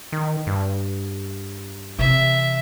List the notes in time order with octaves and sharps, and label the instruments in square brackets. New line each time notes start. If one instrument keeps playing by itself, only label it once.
[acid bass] D#3
G2
[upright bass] C3 E3 [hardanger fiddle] E5